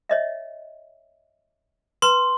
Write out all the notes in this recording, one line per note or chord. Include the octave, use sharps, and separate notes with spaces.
C#5 D#5 E5
B4 A#5 C6